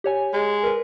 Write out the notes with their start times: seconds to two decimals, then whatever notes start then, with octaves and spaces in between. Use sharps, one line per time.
0.04 G4 C#5 G#5
0.33 G#3
0.63 A#4 B4